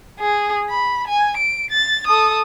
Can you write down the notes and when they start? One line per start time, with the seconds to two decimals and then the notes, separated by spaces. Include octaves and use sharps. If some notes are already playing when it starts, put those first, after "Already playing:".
0.19 G#4
0.69 B5
1.07 G#5
1.37 D7
1.71 A6
2.07 A4 D#6